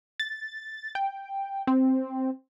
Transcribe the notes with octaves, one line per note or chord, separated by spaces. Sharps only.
A6
G5
C4